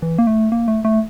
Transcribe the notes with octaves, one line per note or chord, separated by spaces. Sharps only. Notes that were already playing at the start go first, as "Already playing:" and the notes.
E3
A#3
A3
A#3
A3
A3